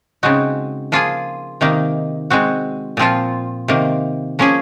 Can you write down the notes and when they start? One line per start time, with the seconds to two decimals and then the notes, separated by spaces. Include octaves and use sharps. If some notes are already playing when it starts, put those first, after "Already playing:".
0.23 C#3 G#3 C4 D#4 F#4
0.92 F3 A#3 F4 G#4
1.61 C3 D#3 A#3 D#4
2.30 G#3 C4 F#4
2.97 A#2 F3 C4 F4
3.68 C3 D#3 A#3
4.39 F3 A#3 C#4 G#4